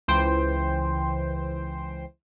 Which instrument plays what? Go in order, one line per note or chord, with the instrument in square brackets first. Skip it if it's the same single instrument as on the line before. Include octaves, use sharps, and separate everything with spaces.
[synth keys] C#2 E3 C5 G5 C7